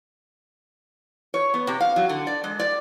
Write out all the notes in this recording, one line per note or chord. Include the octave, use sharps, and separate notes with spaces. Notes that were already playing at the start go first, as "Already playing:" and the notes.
C#5
B3
C3
F5
F#3
D3
D5
G#3
D5